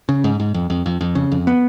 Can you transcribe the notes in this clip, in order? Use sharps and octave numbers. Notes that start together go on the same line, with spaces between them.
C#3
G#2
G#2
F2
F2
F2
F2
C#3
F2
B3